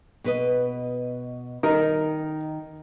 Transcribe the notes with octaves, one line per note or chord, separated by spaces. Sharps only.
B2 B4 D#5
D#3 D#4 A#4